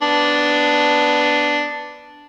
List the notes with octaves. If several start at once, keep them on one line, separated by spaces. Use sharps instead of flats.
B3 D4